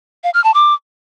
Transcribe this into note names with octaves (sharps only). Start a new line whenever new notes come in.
F5
F6
A5
D6